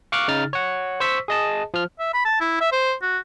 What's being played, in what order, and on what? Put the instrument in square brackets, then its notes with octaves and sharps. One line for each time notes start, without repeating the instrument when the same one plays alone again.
[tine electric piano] F5 C#6 D6 F6 F#6
C#3 D#4 F6 A6
C#5 F#5
C5 C#6 E6 B6
G#4 D#5 A5
F3 F6
[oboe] E5
B5
A5
E4
E5
C5
F#4